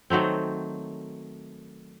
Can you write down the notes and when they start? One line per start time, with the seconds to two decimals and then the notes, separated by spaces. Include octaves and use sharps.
0.10 D#3 F#3 A3 C4